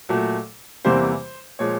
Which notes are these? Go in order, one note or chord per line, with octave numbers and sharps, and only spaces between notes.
A#2 F#3 A3
E2 C3 E3 G3 A#3 C5
A#2 F3 G#3 C#5